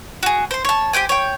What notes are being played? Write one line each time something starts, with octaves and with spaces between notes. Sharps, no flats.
F#4 G#4
C5 C6
C#5 A5
G4 C5 G5 G#5
C#5 G5